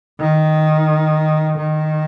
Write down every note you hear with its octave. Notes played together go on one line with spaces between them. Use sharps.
D#3
D#3